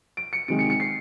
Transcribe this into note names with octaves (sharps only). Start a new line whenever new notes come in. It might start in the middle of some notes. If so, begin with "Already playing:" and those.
D7
C#7
C3 D#3 G#3 D7
C#7
C#7
C7